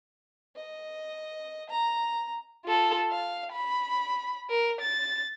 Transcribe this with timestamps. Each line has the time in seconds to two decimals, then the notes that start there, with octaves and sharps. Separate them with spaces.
0.56 D#5
1.69 A#5
2.65 F4 A4
3.11 F5
3.52 B5
4.50 A#4
4.81 A6